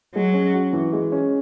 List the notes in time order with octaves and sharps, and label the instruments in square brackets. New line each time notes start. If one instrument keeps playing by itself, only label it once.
[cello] F#3 [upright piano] G#3
[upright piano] C#4
F#4
E3
G#3
C#4